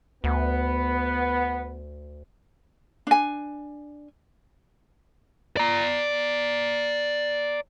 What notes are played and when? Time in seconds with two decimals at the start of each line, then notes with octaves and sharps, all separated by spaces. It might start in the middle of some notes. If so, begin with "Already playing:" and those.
0.24 D2 B3
3.07 D4 G#5
5.57 D5 A#5